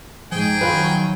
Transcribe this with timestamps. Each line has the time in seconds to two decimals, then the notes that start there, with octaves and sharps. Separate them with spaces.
0.32 G#2 F3 G#3 G#4 G5
0.61 D#3 F#3 F4 B4